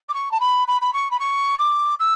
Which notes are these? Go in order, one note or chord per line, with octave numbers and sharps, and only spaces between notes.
D6
C#6
A5
B5
B5
B5
C#6
B5
C#6
D6
E6